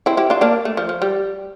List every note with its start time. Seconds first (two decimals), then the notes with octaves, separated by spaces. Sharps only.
0.06 C4 E4
0.17 E4 G4
0.30 D4 F4
0.41 A#3 D4
0.65 A3
0.77 F3
0.89 F3
1.02 G3